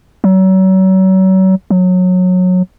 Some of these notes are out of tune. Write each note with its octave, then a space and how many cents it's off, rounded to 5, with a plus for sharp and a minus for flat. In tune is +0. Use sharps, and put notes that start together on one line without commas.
F#3 +35
F#3 -20